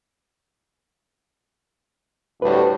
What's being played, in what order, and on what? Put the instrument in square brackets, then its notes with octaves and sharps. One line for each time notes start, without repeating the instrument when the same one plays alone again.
[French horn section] D2 A2 G3 [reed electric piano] B4